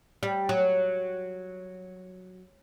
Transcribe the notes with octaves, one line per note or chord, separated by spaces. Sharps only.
G3
F#3